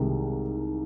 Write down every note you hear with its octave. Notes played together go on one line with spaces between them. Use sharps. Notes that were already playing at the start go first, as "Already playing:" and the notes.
Already playing: C2 C3 D#3 G#3